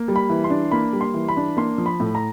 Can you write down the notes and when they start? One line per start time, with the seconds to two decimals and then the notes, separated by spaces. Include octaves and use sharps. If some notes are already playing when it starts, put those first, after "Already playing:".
Already playing: A#3
0.08 G3
0.16 B5
0.30 E3
0.44 C6
0.50 D4
0.71 A#3 B5
0.93 G3
1.01 C6
1.14 E3
1.29 B5
1.37 D4
1.57 A#3 C6
1.78 F3
1.86 B5
2.00 A2
2.15 A#5